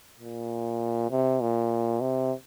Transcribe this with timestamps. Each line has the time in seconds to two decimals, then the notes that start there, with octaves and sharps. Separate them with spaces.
0.20 A#2
1.11 C3
1.41 A#2
2.01 C3